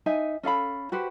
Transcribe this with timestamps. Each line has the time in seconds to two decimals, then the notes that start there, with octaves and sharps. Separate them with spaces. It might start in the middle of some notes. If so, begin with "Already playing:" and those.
0.06 D#4 E5 G#5
0.43 C#4 A4 F5 B5
0.92 F#4 G4 B4 C5